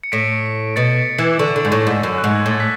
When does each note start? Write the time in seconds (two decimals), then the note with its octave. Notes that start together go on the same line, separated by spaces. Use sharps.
0.04 C#7
0.12 A2 B6 D7
0.76 B2 A6 C#7
0.91 A6 C#7
1.18 E3 E6
1.24 D6
1.34 D6
1.39 D3 C#6
1.56 D3
1.65 G#2
1.71 A2 C#6
1.87 G#2 D6
2.03 F#2 E6
2.18 F#6
2.24 G#2
2.35 G#6
2.46 A2 A6
2.60 B6